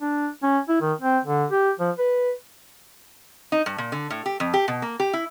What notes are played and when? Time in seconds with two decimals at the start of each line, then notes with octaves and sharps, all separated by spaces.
0.01 D4
0.43 C#4
0.69 E4
0.81 D#3
1.01 C4
1.25 D3
1.51 G4
1.80 F3
1.99 B4
3.52 D#4
3.66 G2
3.78 A#2
3.92 D3
4.10 A2
4.26 G4
4.40 F2
4.54 G4
4.68 B2
4.82 A#3
5.00 G4
5.13 E4